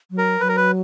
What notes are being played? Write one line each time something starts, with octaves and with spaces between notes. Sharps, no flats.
F#3
A#4
F#3 B4
A#4
B4